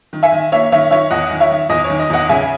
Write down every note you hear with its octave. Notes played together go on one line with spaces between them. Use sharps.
D#3
E5 G#5
D#3
A#3 C#5 E5
D#3 C#5 E5
D#3 C#5 E5
E2 D#5 F#5
D#3
C#5 E5
D#3
E2 D#5
C#5
D#3
D#5
E2 D#5 F#5
C#3 E5 G#5